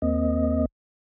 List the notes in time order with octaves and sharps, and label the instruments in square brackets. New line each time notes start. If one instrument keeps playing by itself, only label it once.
[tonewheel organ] D#2 A#3 C4 D#5